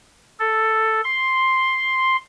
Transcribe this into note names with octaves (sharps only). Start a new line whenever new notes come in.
A4
C6